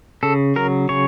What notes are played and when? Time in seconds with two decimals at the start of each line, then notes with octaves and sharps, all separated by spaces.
0.23 C#3 A4
0.56 F#3 A#4
0.89 C#3 C#5